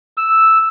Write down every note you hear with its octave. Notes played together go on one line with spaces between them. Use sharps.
E6